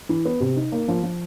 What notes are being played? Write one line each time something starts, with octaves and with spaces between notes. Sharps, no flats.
E3
B3
C3
D#4
A#3
F3
F3